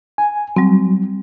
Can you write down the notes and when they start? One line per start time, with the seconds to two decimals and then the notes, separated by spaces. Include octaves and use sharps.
0.18 G#5
0.56 F#3 G3 C4